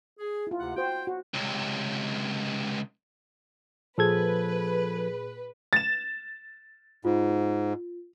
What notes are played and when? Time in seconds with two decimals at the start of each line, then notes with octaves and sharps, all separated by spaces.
0.19 G#4
0.47 E4 F4
0.60 D2 C3 F#5
0.77 F#4 C5 G5
1.07 F#4
1.34 C#2 C3
3.98 A#2 F3 G#4 A4 B4 G#6
5.73 A6 E7
7.05 G#2 F4